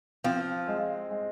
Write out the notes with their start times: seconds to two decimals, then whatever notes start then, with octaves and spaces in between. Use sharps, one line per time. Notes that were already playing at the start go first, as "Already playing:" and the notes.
0.24 F3 C4
0.67 G#3
1.10 G#3